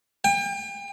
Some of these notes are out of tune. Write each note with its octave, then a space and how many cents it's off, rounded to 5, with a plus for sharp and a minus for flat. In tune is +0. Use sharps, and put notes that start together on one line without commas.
G5 +40